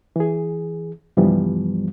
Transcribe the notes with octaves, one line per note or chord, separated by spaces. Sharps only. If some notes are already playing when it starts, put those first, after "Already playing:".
E3 G#4
C#2 G2 E3 F3 G3 B3